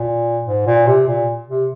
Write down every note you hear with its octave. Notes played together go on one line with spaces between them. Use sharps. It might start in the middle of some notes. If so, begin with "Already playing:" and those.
Already playing: A#2
G#2
A#2
C3
A#2
C3